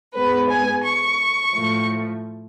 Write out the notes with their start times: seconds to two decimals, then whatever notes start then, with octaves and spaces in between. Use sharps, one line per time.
0.14 G#2 G#3 B3 B4
0.50 G#5
0.84 C#6
1.54 A2 F3 A3